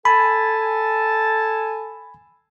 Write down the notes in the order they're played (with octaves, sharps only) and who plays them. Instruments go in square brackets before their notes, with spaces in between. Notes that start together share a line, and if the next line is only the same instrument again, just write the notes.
[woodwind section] A4 G#5 A5 [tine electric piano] B5